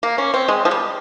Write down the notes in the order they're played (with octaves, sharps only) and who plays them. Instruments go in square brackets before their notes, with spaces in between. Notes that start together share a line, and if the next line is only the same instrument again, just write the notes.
[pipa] A#3
C#4
C4
G#3
F3
G3